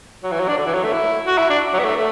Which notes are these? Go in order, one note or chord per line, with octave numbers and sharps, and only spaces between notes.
F#3
E3
F#3
D4
D3
E3
F#3
A3
E4
F#4
E4
D4
F#3
B3
A3
A3